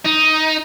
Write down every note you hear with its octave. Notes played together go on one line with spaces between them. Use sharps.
D#4